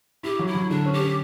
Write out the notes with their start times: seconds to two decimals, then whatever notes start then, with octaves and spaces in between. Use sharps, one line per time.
0.23 E4 G4
0.39 F#3
0.47 E4
0.55 F#3
0.70 D3 D4
0.86 C#4
0.93 G4
1.01 C#4